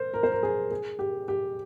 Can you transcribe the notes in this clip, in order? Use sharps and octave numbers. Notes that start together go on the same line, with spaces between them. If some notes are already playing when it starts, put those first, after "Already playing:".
Already playing: A#4 C5
A#4
C5
A#4
G#4
G#4
G4
G4